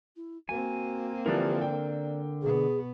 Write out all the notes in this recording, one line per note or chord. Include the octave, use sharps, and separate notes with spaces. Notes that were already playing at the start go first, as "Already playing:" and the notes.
E4
A#3 C4 F#4 G#5
D3 E3 F3 D4 G4 A#4
D5 G5
B2 B3 G#4